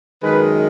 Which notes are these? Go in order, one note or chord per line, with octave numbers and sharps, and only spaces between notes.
F#2 D#3 G#3 B4